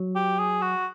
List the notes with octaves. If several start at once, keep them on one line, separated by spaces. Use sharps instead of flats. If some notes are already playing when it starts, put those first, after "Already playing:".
Already playing: F#3
G4
G#4
F#4